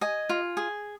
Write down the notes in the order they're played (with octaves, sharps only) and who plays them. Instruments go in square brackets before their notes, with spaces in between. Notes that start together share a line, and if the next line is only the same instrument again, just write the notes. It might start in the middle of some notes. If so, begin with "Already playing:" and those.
[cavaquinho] D#5 G#5
F4
G#4